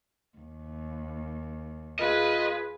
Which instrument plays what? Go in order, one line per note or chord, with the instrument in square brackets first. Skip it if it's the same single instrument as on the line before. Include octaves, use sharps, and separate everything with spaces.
[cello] D#2
[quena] F4 [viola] G#4 B4 [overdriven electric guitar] D#5